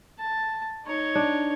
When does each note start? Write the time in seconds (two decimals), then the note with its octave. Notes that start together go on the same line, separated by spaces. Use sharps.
0.18 A5
0.85 D#4 C#5
1.15 D4